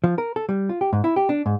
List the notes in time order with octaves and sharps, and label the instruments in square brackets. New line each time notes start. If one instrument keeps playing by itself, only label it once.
[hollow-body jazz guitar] F3
A#4
A4
G3
F4
G4
G#2
E4
G4
D4
G#2